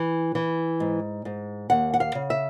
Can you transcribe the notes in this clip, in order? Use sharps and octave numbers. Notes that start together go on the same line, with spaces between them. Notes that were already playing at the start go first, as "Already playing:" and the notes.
Already playing: E3
E3
G#2
G#2
D#2 F#5
F#5
F5
C#3
E5